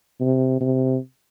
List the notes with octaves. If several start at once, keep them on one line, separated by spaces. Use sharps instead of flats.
C3
C3